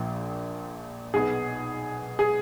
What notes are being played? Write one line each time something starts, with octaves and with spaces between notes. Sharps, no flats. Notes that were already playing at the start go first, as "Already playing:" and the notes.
Already playing: A#1 A#2 F3
B1 B2 G#4
G#4